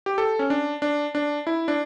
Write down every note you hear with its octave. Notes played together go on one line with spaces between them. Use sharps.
G4
A4
C#4
D4
D4
D4
E4
D4